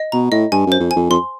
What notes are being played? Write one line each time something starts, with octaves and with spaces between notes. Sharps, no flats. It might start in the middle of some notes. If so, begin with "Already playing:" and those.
Already playing: D#5
B2 A#5
A2 D#5
G2 G#5
F#2
C5
F2
G#5
F2
F2 C6